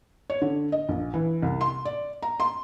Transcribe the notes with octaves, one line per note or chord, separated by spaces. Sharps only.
C#5
D3
D#5
A#1
E3
C2
C6
D5
A#5
C6